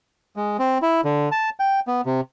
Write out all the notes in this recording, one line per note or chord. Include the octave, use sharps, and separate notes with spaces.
G#3
C4
E4
D3
A5
G5
B3
C3